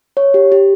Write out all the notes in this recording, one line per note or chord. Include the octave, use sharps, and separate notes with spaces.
C#5
G4
G4